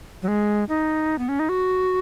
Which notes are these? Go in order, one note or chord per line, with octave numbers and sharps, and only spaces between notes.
F#3
G#3
D#4
B3
C#4
D#4
F#4